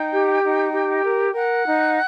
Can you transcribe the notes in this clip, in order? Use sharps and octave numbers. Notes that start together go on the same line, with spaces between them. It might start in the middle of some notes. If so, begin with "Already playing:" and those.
Already playing: D#4 G5
G4
D#4
G4
A#4
A#4 F#5
D#4